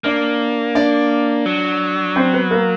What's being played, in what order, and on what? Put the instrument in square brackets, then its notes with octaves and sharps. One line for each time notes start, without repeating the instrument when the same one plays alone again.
[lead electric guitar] A#3 [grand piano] D4 D5
[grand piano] D4 D5
[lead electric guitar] F#3
[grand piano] C4 C5
B3 B4
A#3 A#4